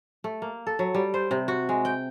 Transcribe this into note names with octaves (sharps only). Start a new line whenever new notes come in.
A3
A#3
A4
F#3
G3
C5
C3
F#4
G#3
G5